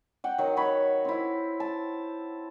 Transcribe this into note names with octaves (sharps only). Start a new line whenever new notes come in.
F#5 G5
D#3 F#3
C#5 B5
C4 E4
A5